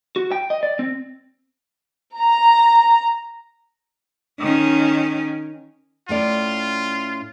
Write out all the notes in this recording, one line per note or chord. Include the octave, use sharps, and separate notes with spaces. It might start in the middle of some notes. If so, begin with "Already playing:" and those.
F#4
G5
D#5
D5
C4
A#5
D#3 C#4
A2 C#4 F4 D5